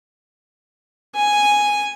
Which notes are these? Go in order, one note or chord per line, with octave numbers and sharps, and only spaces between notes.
G#5